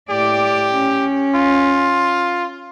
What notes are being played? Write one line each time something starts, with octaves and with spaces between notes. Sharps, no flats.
A2 G4 D5
C#4
F4